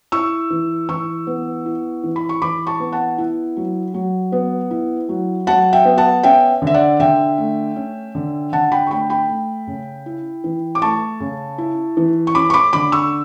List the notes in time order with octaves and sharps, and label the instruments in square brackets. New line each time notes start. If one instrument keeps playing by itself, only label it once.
[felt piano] E4 C#6 E6
E3
E3 C#6 E6
B3
E4
E3
B5
C#6
E3 B5 D6
A5 C#6
B3
F#5 A5
E4
F#3
F#3
B3
E4
F#3
F#3 F#5 A5
E5 G5
B3
F#5 A5
C#4 E5 G5
D3 E5
D5 F#5
D3 E5 G5
A3
C#4
D3
D3 F#5 A5
G5 B5
C#6
A3 G5 B5
G5 B5
A3
C#3
E4
E3
D6
A3 A5 C#6
C#3
E4
E3
C#6
C#4 B5 D6
C#6
B5 D6
D3 B5 D6
C#6 E6